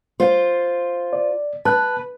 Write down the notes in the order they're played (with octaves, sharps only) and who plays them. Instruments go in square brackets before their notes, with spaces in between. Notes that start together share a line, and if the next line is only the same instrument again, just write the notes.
[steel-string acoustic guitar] F4 C5
[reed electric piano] D5
[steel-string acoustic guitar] B4 [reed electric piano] A5 F#6